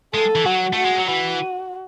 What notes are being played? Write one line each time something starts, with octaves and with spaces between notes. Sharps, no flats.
G#3 A4
E3
F#3 F#4
A3 F#4
G#3
F#3
E3 F#4